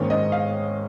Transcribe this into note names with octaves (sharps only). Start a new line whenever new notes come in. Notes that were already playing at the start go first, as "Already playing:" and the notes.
Already playing: G#2 D#3 A#3 C#4 C#5
D#5
F5